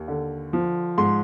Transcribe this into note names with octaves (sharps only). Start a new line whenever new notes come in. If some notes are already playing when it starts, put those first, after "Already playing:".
Already playing: D#2
D3
F3
G#2 C6